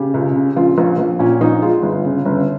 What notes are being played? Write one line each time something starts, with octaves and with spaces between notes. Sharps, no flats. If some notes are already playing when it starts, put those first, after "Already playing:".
Already playing: C#3 G4
C#2
C#3
A#1 F4
A#1
A#1
A#2 C#4
A#1 D#4
G#3 F4
G1
C#3
G1